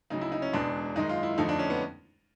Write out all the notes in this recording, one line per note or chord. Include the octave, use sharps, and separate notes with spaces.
D2 C#3 F#3 D#4
E4
D#4
C#4
E1 E2 B2 G#3 D4
F#2 D#3 G#3 D#4
F4
E4
F2 D3 F3 A3 D#4
D4
C#4
B3